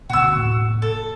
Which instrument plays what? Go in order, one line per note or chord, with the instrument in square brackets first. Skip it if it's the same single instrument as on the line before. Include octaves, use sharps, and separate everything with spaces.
[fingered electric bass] D2 B2 [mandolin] F#4 E6
[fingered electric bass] F1 A2 A#3
[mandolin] A4